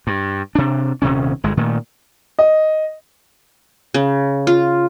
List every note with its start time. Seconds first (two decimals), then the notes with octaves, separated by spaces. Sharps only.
0.07 G2
0.55 C3 D4
1.02 D#1 C3 D#3 C#4
1.44 G1 G#3
1.57 A#2 D#3 A3
2.39 D#5
3.94 C#3
4.47 F4